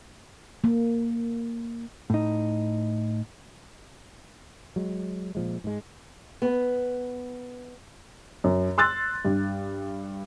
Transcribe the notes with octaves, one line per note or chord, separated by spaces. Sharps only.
A#3
A2 D#4
F#3 G#3
A#2 F3 G#3
G#2 G#3
B3
F#2
C6 E6 F#6 A6
G2